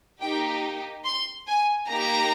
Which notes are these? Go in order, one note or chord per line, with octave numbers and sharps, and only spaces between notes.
A#3 D#4 G4 G5
C6
G#5
A#3 D#4 G4 A#5